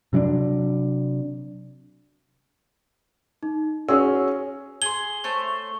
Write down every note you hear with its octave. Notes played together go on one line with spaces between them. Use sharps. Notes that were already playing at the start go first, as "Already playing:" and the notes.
C3 F#3 C#4 D4
D#4
C#4 F#4 G#4 E6
G#4 C6 G7
A3 C5 C#5